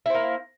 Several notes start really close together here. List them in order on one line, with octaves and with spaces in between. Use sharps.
E4 C5 A#3